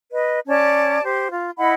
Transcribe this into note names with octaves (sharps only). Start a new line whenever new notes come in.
B4 D#5
C#4 C#5 D5 A5
G4 C5
F4
E4 D#5 F#5 B5